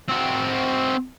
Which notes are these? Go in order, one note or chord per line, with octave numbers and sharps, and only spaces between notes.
C4 F#4